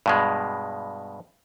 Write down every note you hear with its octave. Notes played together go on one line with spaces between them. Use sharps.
G2 B2 G#3